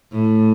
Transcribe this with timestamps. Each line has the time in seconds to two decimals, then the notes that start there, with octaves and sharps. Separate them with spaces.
0.12 A2